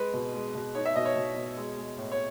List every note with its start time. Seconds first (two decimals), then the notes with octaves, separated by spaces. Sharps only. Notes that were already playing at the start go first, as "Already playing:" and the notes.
Already playing: G#3 B4
0.13 B2
0.34 G#3
0.55 B2
0.75 D#4 C#5
0.85 E5
0.96 B2 D#5
1.05 C#5
1.16 B2
1.36 B2
1.57 G#3
1.78 G#3
1.98 A2
2.12 C#5